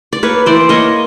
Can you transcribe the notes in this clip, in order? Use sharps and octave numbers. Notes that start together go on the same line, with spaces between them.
D5
A#3 B4 C#5
E3 C5 D5
A#3 C#5 D#5